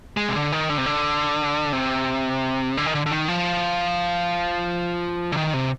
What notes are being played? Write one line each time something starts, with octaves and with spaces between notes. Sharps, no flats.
G#3
C3
D3
D#3
D3
C3
D3
C3
D3
D#3
D3
D3
D#3
F3
D3
D#3
C3